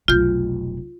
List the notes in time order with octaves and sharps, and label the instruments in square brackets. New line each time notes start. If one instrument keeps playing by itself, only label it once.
[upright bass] F1 B1 [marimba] F4 G6